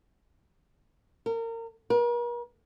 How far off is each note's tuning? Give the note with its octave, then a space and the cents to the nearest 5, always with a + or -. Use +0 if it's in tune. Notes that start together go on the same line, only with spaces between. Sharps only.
A#4 -30
A#4 +45